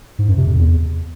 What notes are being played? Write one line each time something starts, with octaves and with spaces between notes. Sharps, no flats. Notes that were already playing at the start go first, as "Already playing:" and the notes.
G#2
F#2
C3
F2
E2